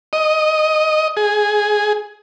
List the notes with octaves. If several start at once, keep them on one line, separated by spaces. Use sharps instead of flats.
D#5
G#4